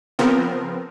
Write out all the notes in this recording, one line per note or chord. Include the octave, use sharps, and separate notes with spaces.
C#3 F3 B3 C4 A#4